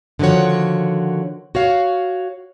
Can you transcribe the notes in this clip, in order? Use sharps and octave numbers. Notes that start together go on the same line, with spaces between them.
D3 D#3 F3 F#4 C#5
F#4 C#5 F5